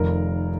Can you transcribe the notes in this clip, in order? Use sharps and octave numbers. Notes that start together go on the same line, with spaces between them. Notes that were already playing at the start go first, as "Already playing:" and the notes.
Already playing: F1 F2 D#3 A#4